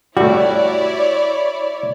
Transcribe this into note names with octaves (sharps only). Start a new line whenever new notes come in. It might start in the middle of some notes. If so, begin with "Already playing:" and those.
G3 A3 E4 F#4 C#5 D5